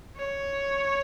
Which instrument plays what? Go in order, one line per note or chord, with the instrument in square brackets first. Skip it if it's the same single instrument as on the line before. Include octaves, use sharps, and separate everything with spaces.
[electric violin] C#5